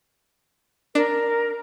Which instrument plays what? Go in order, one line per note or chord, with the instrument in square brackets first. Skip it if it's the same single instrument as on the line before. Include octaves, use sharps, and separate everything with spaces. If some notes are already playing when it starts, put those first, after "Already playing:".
[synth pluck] D4 [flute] A#4